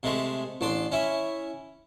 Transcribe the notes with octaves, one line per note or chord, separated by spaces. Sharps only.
C3 G#3 A3
A1 D4 C6
C#4 E4